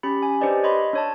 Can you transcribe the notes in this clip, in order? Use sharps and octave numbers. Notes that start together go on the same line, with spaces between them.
C#4 G4 B5
G#5
D4 G4 B4 C5 D5 D#5
C#5 D#5 B5 C6
D4 C#5 A5